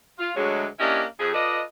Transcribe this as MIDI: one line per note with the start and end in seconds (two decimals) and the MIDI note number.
0.19 0.30 65
0.36 0.65 38
0.36 0.65 54
0.36 0.65 56
0.79 1.03 58
0.79 1.03 61
0.79 1.03 62
0.79 1.03 64
0.79 1.03 67
0.79 1.03 75
1.19 1.32 41
1.19 1.32 68
1.33 1.60 65
1.33 1.60 69
1.33 1.60 71
1.33 1.60 74
1.33 1.60 75